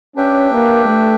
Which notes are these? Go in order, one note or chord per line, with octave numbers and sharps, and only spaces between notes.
C#4 D4 G4 B4 E5 G5
A#3
A3